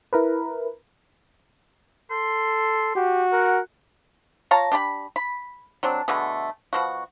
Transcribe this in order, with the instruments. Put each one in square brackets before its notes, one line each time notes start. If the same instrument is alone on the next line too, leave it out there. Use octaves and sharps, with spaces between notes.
[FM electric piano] E4 A#4 B4
[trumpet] A4 [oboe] C6
[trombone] F#4 [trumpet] G4
[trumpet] A#4 [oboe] F#5
[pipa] F4 C#5 A5 A#5
D4 G4 A5 B5
B5
F#3 C4 D4
B2 D3 A3 G#4
B2 F3 F#4